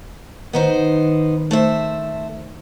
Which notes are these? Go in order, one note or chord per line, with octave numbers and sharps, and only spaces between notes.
D#3 B3 D#4 C5
A3 C5 E5